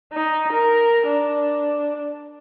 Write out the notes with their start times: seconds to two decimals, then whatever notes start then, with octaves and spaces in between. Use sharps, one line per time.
0.13 D#4
0.52 A#4
1.07 D4